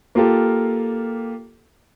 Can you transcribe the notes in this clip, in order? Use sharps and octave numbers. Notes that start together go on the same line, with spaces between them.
A#3 F4 G4 A4